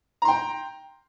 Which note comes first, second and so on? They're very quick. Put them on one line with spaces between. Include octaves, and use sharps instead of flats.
A#5 C6 G5